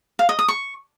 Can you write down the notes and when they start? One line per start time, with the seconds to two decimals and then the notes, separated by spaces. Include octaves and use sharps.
0.19 F5
0.29 D#5
0.39 D#6
0.48 C#6